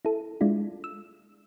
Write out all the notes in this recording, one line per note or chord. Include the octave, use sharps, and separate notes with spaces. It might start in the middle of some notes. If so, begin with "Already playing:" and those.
E4 A4
G#3 D4 E4 F4
E6